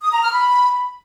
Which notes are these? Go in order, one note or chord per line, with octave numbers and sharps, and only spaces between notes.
D#6
A#5
F6
B5